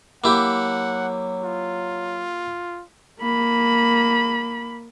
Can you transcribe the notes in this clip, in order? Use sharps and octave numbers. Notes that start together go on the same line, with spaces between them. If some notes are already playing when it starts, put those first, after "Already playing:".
F#3 A#3 E4 G4 F#5
F4
A#3 B5